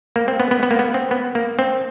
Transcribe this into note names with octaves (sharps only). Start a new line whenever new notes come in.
A#3
C4
B3
B3
B3
A#3
B3
C4
B3
A#3
C4